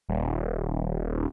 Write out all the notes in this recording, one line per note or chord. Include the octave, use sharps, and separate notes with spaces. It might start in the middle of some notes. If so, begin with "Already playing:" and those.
D#1